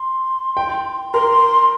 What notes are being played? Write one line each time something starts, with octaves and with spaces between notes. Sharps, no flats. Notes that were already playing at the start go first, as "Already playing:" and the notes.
Already playing: C6
G5
A#4 C6